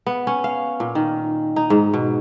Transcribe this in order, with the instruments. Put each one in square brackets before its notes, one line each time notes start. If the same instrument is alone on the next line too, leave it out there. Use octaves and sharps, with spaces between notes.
[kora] B3
C#4
F5
A#2
D#3
D#4
G#2
B2